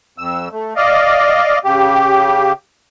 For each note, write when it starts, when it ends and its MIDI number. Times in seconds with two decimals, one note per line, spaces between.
0.18 0.49 41
0.18 0.49 88
0.52 0.74 57
0.76 1.59 74
0.76 1.59 75
0.76 1.59 77
1.64 2.52 49
1.64 2.52 67